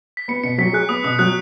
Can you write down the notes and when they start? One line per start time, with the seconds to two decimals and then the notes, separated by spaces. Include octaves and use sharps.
0.17 B6
0.28 B3 C#7
0.43 B2 C#7
0.58 F#3 B6
0.73 G#4 F#6
0.89 B3 D#6
1.04 B2 D#6
1.19 F#3 F#6